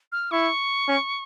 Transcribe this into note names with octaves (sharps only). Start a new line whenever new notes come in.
F6
E4 C#6
C#4